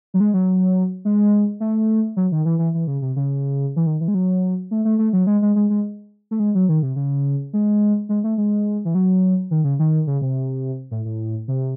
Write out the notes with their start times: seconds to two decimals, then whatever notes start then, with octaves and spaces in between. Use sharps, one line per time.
0.14 F#3
0.20 G#3
0.34 F#3
1.05 G#3
1.60 A3
2.16 F#3
2.32 D#3
2.45 E3
2.59 E3
2.74 E3
2.87 C#3
3.02 C3
3.16 C#3
3.76 E3
3.87 D#3
4.01 E3
4.08 G#3
4.14 F#3
4.71 A3
4.85 A3
4.99 A3
5.13 F#3
5.27 G#3
5.42 G#3
5.56 G#3
5.70 G#3
6.31 A3
6.40 G#3
6.55 F#3
6.69 D#3
6.83 C3
6.96 C#3
7.53 G#3
8.09 G#3
8.24 A3
8.38 G#3
8.85 E3
8.95 F#3
9.51 D#3
9.64 C#3
9.79 D#3
10.07 C#3
10.22 C3
10.91 A2
11.05 A2
11.48 C3